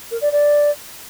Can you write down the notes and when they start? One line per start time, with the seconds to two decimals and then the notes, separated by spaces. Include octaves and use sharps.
0.11 A#4
0.21 D5
0.31 D5